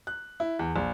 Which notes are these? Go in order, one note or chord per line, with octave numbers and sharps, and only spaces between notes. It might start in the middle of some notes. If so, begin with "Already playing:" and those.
F#6
E4
E2
A#1